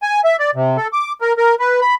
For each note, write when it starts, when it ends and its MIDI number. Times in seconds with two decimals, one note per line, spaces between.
0.02 0.21 80
0.24 0.36 76
0.39 0.51 74
0.55 0.77 48
0.77 0.88 69
0.93 1.13 86
1.21 1.33 70
1.38 1.55 70
1.60 1.80 71
1.81 1.95 83